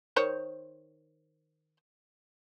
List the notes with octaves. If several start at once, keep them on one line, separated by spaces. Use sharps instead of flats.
D#3 C5 C#5